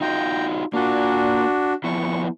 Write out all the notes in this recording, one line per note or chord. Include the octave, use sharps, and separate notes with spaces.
D#4 F4 F#4 G5 A#5
A#3 D4 F4 F#4
F3 B3 E4 C#6